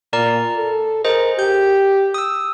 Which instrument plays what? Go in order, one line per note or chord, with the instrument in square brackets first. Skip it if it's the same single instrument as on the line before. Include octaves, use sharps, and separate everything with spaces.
[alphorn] A#2 [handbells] A#4 D5 A#5
[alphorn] A4
[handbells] G#4 C5 D#5 [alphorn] A#4
[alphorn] G4 [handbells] G6
[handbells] D#6 E6